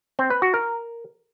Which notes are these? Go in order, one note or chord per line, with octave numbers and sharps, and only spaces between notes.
C4
B4
F#4
A#4